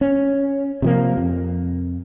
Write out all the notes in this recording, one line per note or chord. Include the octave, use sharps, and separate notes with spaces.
C#4
C3 F3 A#3
F2